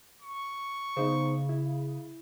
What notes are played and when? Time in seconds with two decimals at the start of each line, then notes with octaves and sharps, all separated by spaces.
0.22 C#6
0.97 C#3 B3 D#4 C5
1.49 E4